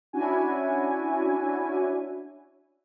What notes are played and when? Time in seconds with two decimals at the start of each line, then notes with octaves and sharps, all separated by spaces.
0.13 C#4 D4 E4 F#4 G#5